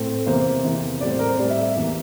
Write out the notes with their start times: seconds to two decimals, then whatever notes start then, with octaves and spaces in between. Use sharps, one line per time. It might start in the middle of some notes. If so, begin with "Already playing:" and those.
Already playing: A2 A3 C4
0.26 E2 C3 E3 A#3 C5
0.64 E2 C3 E3 A#3
1.00 A2 G3 C4 D5
1.10 C5
1.19 A#4
1.29 C5
1.38 A2 G3 C4 D5
1.50 E5
1.63 E5
1.75 E2 E3 A#3